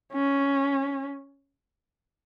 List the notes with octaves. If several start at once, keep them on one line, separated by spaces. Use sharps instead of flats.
C#4